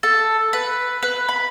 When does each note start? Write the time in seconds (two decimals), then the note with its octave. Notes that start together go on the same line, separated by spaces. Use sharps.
0.03 A4
0.53 B4
1.03 B4
1.29 B5